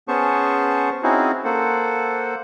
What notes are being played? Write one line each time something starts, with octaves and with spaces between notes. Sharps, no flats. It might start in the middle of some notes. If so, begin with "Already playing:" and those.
B3 C#4 G#4 C5 A5 C#6
C4 C#4 D#4 E4 F#4 G#4
A#3 A4 C5 F#5